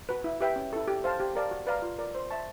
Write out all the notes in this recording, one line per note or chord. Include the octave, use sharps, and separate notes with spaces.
F#4 B4
E4
G4 B4 E5 G5
C#4
E4 A4
G4
C5 F5 A5
G4
A#4 D5 F5 A5
F#4
B4 D5 F5 A#5
F4
A#4 D5
C5
E5 A5 C#6